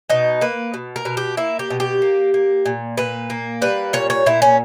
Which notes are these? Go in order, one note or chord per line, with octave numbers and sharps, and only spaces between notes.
B2 D#4
A#3 B4
B2
A#4
B2
G4
A#3 E4
G4
B2
G4
A#3
A#3
A#2
A#2 B4
A#3
G3 B4
A#2 C#5
C#5
A#2 E4
C#4